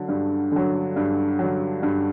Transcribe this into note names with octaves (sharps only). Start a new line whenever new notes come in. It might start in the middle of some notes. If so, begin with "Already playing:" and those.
Already playing: D3 F#3
G2
D3 F#3
G2
D3 F#3
G2